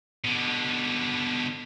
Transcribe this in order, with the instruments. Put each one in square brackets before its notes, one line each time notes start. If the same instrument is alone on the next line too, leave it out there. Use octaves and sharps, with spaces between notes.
[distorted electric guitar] B2 D3